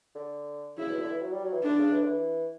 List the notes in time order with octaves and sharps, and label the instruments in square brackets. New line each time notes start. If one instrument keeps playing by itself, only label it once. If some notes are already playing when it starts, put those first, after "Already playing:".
[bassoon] D3
[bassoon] C#3 [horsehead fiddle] E4
[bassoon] B2
D3
E3
F#3
G3
F#3
E3
[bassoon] D3 [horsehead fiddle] D4
[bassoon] C#3
E3
D3
E3